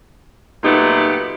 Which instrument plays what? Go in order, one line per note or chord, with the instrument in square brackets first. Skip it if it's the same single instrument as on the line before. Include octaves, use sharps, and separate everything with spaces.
[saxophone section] A#2 F#3 A3 B3 D#4 G4